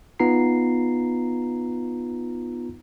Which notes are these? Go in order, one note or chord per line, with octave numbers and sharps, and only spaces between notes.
B3 D#4 F4 A#5 C7